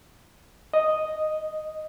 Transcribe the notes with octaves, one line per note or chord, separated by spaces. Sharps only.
D#5